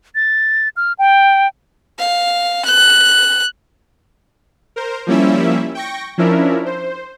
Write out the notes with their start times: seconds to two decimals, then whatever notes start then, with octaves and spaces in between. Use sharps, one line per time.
0.15 A6
0.77 F6
0.99 G5
1.99 F5
2.65 F#6
4.76 A#4 C5
5.07 F3 G3 A#3 C#4 E4 E5
5.75 G5 C#6 A#6
6.18 F3 C#4 D4 E4 A#4 E5
6.66 C5